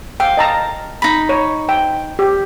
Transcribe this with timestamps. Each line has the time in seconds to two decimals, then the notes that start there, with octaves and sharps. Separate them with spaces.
0.20 F5 G5
0.37 D#5 A5 A#5
1.02 D#4 B5
1.29 C#5
1.69 G5
2.19 G4